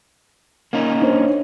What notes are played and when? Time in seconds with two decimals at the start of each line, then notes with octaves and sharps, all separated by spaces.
0.73 A#3 C#4 D#4
1.01 D4 C5 C#5